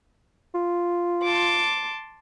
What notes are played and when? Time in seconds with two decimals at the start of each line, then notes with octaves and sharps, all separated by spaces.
0.55 F4
1.24 A5 C6 D6